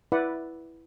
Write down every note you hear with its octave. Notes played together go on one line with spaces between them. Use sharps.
E4 B4 D5 F#5